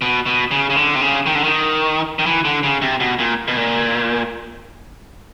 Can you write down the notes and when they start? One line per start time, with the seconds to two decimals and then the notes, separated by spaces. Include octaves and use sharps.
0.02 B2
0.26 B2
0.51 C#3
0.70 C#3
0.76 D3
0.95 C3
1.02 C#3
1.26 D#3
1.35 D3
1.44 D#3
2.19 D#3
2.26 E3
2.45 D3
2.63 C#3
2.82 C3
3.00 B2
3.19 A#2
3.48 B2
3.57 A#2